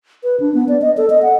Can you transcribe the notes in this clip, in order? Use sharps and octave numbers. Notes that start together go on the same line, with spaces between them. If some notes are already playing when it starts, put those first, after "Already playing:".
B4
D4
B3
D5
D#5
A4
D#5
F#5